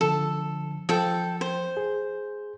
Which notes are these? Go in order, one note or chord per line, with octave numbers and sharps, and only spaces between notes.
D3 F3 A4
F3 A4 G5
C5
G#4